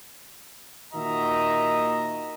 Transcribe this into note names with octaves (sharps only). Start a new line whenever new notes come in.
A#2 D#3 F#4 D#5 E5 A#5